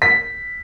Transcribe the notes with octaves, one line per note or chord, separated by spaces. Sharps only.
B6